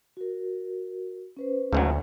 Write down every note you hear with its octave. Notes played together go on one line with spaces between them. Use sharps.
F#4 A#4
C#4 B4 C5
D2 G#2 C#3 F#3